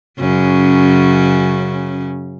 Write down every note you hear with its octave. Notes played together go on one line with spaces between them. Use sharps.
F#2 C#3 C#4